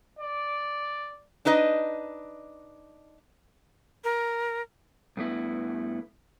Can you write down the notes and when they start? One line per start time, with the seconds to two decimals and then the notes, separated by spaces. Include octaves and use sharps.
0.19 D5
1.45 D4 D#4 B4 D#5
4.04 A#4
5.17 G2 A3 B3 E4